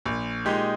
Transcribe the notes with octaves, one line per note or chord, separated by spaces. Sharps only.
A#1
A#2 G#3 D#4 G4